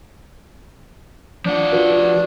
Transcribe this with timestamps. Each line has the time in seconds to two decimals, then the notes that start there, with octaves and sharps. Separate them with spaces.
1.45 F3 D4 F#5
1.72 F4 F#4 B4